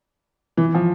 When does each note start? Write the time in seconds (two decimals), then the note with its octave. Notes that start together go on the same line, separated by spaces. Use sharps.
0.57 E3
0.74 F3